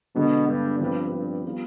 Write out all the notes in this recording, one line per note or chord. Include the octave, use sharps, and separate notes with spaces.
B2 D3 G#3 B3 D4
G2
G2 F3 C4 F4 B4 D5
G2
G3 B3 F4